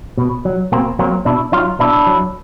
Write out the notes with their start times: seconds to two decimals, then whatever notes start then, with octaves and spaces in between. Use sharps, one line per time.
0.18 B2
0.45 F#3
0.72 B2 A#3 C4
0.99 F#3 A#3 C4
1.25 B2 D4 E4
1.52 F#3 D#4 F4
1.79 B2 D4 E4
2.07 F#3